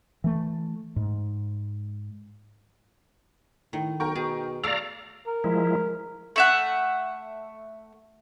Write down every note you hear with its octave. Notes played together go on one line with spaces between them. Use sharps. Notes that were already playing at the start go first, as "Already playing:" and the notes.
E3 A3
G#2
A2 D#3
B1 A#4 G5 C#6
B2 G#4 A5
A3 D5 F5 A#5 E6
A#4
F3 G#3 E4
A3 E5 F#5